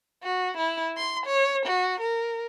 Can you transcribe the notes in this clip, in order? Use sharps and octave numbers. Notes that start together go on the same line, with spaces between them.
F#4
E4
C6
C#5
F#4
A#4